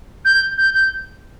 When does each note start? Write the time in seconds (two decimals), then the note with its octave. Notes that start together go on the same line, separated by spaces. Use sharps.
0.25 G6
0.57 G6
0.74 G6